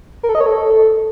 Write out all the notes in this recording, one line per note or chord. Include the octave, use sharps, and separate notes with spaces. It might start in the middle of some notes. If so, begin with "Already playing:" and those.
A#4
A4
D#5
C#5
A4